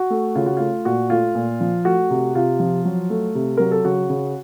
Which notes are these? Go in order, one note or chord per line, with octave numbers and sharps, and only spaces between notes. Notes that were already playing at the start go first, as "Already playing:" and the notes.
Already playing: F#4
A3
C#3 F4
F#4
A3 F4
A#2 F#4
A3 F4
A#2
F3
A3 F#4
C3
C3 F4
F3
F#3
A3
C3
F#3 A#4
A4
C#3 F#4
C#3